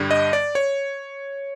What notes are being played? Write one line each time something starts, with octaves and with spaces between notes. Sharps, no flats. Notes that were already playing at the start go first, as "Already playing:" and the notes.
Already playing: G2 D3 G3
D#5
D5
C#5